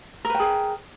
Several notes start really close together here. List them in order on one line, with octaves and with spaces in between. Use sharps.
A#4 B4 G5 G#4